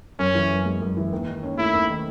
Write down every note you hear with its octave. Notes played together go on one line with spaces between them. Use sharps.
F#2 C#4
E3
F#2
G#3
F#2
E3
D#2
D#3
C#4
A3 E4
D#2
D#3